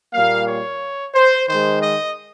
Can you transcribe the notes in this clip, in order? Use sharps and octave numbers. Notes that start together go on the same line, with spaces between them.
A#2 G3 A#3 F5
C#5
C5
D#3 G#3 C5
D#5